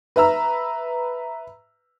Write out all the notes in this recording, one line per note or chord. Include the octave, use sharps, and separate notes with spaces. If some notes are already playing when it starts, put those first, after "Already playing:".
B4 E5 A#5 E6